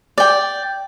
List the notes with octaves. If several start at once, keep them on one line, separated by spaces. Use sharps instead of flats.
D5 G5